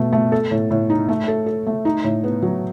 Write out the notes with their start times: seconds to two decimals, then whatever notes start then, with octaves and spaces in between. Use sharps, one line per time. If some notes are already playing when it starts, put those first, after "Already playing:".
Already playing: B2 A3
0.13 A3
0.32 A4
0.51 A2
0.71 A2
0.90 D#4
1.09 A3
1.28 A4
1.46 A4
1.66 A3
1.85 D#4
2.04 A2
2.24 B3
2.42 F#3